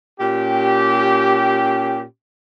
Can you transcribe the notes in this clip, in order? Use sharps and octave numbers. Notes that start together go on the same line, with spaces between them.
A#2 C#4 G4